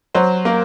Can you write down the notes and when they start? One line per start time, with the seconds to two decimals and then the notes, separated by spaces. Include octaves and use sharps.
0.15 F#3 C5
0.45 A#3 A#4